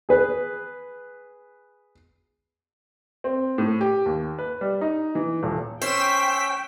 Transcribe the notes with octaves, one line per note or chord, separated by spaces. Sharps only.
G#4 B4
C4
A2
G4
D#2
B4
G3
D#4
E3
D#1
C#4 C5 G5 E6 B6